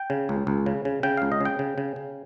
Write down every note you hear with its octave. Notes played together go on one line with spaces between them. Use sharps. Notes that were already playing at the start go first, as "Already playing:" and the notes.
Already playing: G5
C#3
C#2
C#2
C#3
C#3
C#3 G5
C#2 F5
D#5
C#3 G5
C#3
C#3
C#3